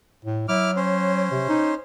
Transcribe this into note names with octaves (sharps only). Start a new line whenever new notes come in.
A2
F#3 E4 D6 F6
C#4 C5
C3
D#4